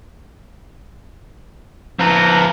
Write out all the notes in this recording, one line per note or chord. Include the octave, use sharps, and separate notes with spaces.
F3 B4 A#5